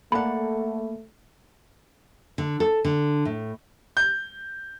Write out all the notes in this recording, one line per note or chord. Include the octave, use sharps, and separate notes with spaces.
A3 A#3 A4 D5 F#5 B5
D3
A4
D3
A2
G6